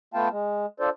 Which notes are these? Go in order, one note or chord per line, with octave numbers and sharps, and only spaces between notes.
A3 B3 F4 F5 G5 A5
G#3
D4 F4 A4 C5 D5